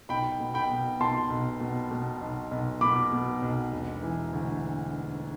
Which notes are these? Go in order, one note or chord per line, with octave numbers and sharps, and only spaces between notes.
B1 G5 B5
B2
G5 B5
B2
B1 A5 C6
B1
B2
B2
B1
B1
B2 B5 D6
B2
B1
E1
E3
D2